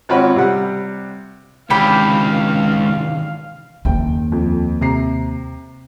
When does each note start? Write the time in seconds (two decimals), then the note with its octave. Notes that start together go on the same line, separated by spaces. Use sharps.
0.09 G#1 C4 C#4 F4 F#4 B5
0.36 C3 G3 F#5
1.70 C#2 C3 D#3 E3 G4 F5 G5 B5
3.85 F#1 D#2 G5
4.32 F2
4.81 C3 A#5 C7